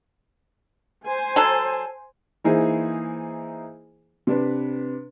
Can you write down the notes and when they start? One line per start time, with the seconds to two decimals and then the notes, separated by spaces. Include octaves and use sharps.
1.04 C5 G#5
1.36 F#3 A4
2.44 E3 A#3 D#4 E4 G#4 C5
4.27 C3 D4 B4